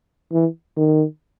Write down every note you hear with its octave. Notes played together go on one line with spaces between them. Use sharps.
E3
D#3